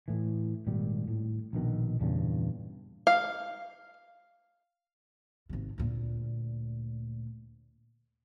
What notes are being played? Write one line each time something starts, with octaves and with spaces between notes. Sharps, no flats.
A2 E3
G#1 A#2 G3
A2
A#1 B2 D#3
E2 G2 A#2 C#3
F5
G#1 C3
D2 A#2